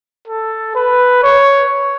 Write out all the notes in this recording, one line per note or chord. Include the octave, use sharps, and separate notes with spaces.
A4
B4
C#5